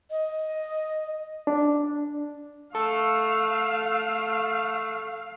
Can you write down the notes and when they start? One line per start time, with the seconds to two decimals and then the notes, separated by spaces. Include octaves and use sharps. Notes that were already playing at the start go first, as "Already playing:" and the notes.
0.11 D#5
1.47 D4
2.75 A3 A4 F5